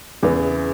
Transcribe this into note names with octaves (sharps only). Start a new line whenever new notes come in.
E2 C#3 E3 B3